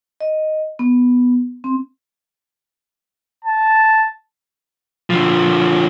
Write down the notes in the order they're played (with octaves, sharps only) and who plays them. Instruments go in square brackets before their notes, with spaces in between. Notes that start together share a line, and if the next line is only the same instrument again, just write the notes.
[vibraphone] D#5
B3
C4
[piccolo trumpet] A5
[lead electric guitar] D3 F3